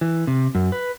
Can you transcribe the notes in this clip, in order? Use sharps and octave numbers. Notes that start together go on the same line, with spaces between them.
E3
C3
F#2
B4